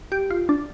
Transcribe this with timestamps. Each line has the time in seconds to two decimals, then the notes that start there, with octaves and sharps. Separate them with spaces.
0.12 G4
0.30 F4
0.49 D4